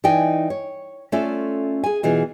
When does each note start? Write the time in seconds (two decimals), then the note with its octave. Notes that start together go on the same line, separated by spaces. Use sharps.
0.04 E3 D#4 D5 D#5 G5 G#5
0.50 C#5
1.12 A3 C#4 F4 A4 D5 E5
1.84 G#4 G#5
2.03 B2 E3 F4 G#4